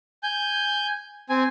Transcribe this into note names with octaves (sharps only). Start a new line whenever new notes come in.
G#5 G6
C4 G#5